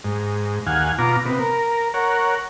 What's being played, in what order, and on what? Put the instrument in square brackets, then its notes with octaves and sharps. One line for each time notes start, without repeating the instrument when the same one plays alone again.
[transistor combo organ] G#2
D#2 F5 F#5 G#5
B2 F4 A#5 D6
C3 B3
A#4
A#4 C#5 F#5